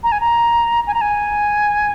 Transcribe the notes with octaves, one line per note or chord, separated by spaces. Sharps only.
A#5
G#5
A#5
G#5
A#5
G#5